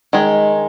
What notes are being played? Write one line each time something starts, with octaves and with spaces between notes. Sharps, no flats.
D#3 G#3